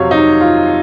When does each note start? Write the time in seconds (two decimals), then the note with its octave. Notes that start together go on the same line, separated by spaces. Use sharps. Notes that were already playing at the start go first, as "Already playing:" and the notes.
Already playing: F2 C3 F#3 C#5 F5
0.11 D#4
0.41 F4